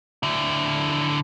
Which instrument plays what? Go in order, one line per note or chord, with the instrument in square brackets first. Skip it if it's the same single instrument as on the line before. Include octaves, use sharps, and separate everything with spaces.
[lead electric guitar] D3 E4